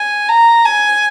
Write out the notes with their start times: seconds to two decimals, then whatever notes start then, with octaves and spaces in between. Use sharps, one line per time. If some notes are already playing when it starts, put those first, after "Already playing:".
Already playing: G#5
0.29 A#5
0.65 G#5